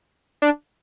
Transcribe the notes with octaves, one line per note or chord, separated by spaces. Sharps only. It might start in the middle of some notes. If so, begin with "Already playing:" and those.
D4